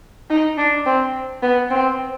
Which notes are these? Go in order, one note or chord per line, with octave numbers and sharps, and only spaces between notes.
D#4
D4
C4
B3
C4